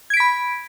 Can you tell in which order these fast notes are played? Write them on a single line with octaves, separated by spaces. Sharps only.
G#6 D7 B6 B5